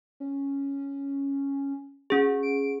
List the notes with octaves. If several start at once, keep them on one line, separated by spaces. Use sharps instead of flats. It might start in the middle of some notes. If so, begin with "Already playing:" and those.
C#4
C#4 F#4 G#4
D7